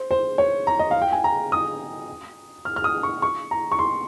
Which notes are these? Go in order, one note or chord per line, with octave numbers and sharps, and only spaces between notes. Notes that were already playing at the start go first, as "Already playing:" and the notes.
Already playing: C5
C5
C#5
A#5
D#5
F5
G5
G#5
A#5
D#6
F6
F6
D#6
C#6
C#6
A#5
C#6
C6